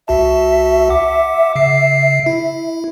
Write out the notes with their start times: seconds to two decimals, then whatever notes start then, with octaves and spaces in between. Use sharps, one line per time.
0.08 C2 F#4 E5 A5
0.89 F#5 D6
1.56 C#3 C7
2.26 E4